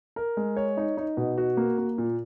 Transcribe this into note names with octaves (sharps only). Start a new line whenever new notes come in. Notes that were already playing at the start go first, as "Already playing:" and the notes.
A#4
G#3
C#5
D#4
D#4
B2
F#4
A#3
A#3
A#2